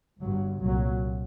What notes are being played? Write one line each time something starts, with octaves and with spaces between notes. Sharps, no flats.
G1 G2 F#3
C2 A#2 F#3